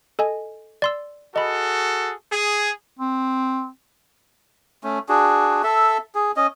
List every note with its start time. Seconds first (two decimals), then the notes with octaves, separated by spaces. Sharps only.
0.19 A4 D#5 G#5
0.82 D5 C6 E6
1.36 F#4 G#4 A4 D#5 B5
2.32 G#4
2.99 C4
4.84 A3 C#4
5.09 D4 F#4 G#4
5.64 A4 E5
6.15 G#4
6.37 C#4 D#5